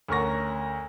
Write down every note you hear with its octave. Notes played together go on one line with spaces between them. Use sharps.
D2 C#4 A#4 F#5 C#6 A#6